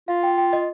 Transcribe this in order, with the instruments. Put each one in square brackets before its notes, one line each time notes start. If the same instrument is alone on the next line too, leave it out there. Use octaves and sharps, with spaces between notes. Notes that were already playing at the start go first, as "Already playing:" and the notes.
[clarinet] F4 [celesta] F5
[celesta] G5
G5
D#5